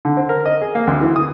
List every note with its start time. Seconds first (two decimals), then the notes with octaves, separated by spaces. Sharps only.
0.05 D3
0.17 C4
0.29 A#4
0.46 D#5
0.62 G#4
0.75 A#3
0.87 D2
1.01 E3
1.16 D#6